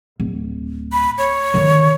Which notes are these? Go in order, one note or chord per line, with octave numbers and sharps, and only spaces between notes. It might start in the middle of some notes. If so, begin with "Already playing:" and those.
D1
B5
C#5
D3 D#3